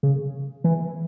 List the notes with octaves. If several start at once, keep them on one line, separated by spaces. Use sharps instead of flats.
C#3
E3